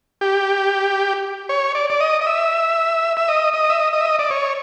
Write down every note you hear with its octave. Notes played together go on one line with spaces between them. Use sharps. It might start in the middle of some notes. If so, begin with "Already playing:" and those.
G4
C#5
D5
D5
D#5
D#5
E5
E5
D#5
D#5
E5
D#5
D#5
E5
D#5
D5
C#5